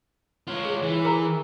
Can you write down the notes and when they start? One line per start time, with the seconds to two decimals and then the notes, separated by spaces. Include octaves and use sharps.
0.47 F4 C#5
0.65 G#4
0.82 E3
1.04 G#4 A#4 A#5